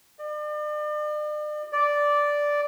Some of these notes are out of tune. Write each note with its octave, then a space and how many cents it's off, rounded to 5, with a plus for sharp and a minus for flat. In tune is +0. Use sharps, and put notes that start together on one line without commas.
D5 +40
D5 -5